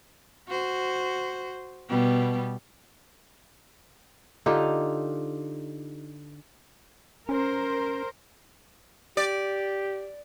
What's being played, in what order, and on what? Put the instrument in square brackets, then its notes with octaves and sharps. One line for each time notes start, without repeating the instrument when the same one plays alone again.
[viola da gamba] F#4 C5
B2 G3 B3
[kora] D3 D#4 F4 G4
[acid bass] C#4 [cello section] A#4 C5
[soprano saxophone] G4 [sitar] D5